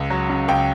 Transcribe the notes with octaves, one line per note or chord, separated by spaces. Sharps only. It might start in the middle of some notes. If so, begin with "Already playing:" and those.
Already playing: C#2
F#3
C#3
C#2 G5